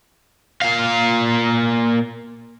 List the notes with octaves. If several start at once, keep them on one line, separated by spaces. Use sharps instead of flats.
A#2 F5